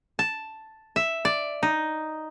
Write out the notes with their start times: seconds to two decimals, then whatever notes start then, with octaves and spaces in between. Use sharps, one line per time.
0.19 A5
0.96 E5
1.25 D5
1.63 D#4